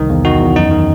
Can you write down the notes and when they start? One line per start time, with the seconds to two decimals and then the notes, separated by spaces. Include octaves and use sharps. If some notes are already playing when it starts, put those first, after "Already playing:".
Already playing: C2 D#3
0.10 E2
0.25 D#3 F#4
0.40 E2
0.56 F#2 D#4
0.71 D#3